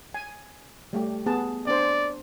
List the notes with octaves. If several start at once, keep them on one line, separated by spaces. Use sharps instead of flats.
G#5
G3 A3 G4
B3 G#4 A5
C4 D4 C5 D5